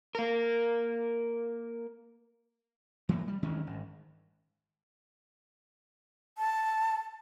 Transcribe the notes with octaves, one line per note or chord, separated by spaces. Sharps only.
A#3 A#4
E3 F#3 A#3
G3
D2 D#3 G#3 C#4
G#1
A5